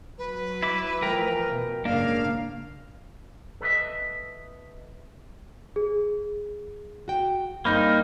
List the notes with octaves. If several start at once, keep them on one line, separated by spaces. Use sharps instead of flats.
F#3 B4
E4 B5 D6
E3 F3 A3 A#4 G5 A#5
B2
F#1 G#2 C#3 A#3 D4 F5
A4 B4 C#5 D#5 E5
G#4
F#4 G5
G2 A#3 C4 D#4 B5 F6 G6